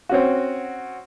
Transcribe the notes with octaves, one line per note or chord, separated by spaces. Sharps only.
C4 C#4 F#4